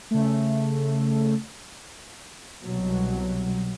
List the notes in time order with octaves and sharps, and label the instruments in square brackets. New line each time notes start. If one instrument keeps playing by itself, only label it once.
[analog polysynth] C#3 A3
[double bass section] C2 B2 F#3